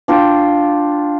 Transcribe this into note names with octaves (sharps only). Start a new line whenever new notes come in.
D4 F4 G5